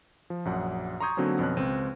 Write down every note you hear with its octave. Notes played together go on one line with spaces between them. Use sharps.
F3
A#1 F#2 F#5
A#5 C6 C#6 D#6 G6 G#6
D3 F#3 A#3 C4 C#4
F2 B2 C#4 F#6
C#2 C4 D#7